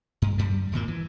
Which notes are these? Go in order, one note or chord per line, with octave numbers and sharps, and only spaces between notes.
G2
F#2 G3
D1 G#1 A#2 A#3
E3